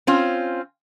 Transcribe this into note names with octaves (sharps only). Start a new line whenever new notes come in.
C4 C#4 F4